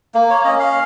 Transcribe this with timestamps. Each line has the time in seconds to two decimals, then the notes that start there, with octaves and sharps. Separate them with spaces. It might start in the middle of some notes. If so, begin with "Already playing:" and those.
0.15 A#3
0.30 C#5
0.44 C#4 D#5
0.60 F5